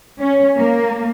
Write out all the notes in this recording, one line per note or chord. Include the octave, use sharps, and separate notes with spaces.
C#4
A#3